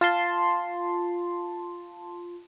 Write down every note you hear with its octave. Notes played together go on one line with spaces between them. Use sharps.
F4 A5 C6